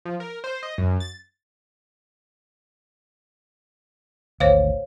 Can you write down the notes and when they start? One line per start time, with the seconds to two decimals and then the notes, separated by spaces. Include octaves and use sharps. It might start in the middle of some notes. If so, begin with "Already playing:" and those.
0.05 F3
0.20 A#4
0.44 C5
0.63 D#5
0.78 F#2
1.00 A6
4.40 G#1 D2 C5 C#5 F5